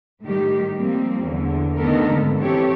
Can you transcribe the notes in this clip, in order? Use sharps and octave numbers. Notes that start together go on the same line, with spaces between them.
A2 D#3 G3 G4
F3 G3 A#3 C4
E2 D3
D3 D#3 A3 B3 A4 A#4
F2 G#2 D3
E3 C4 G4 A4 C#5